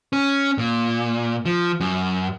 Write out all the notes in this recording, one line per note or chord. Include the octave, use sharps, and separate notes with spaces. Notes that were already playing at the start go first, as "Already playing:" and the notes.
C#4
A#2
F3
F#2